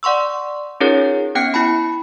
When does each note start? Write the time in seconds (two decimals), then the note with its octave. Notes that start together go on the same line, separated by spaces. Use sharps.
0.03 D5 F#5 C6 C#6 E6
0.80 C#4 D#4 F4 G#4 A#4 C#5
1.35 B3 C#4 G5 F#6 C#7
1.54 E4 A5 B5